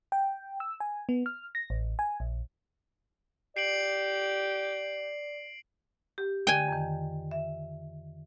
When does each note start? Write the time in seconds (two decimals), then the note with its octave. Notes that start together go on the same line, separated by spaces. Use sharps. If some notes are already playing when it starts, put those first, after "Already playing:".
0.12 G5
0.60 E6
0.80 G#5
1.09 B3
1.26 F6
1.55 A#6
1.70 A1
1.99 G#5
2.20 A#1
3.57 G4 D5 C7 D7 F#7
6.18 G4
6.47 D3 G5 G#5
6.68 F2 D#3
7.31 E5